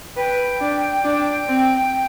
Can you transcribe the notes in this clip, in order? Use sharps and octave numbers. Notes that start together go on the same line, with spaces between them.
B4 G5
D4
D4
C4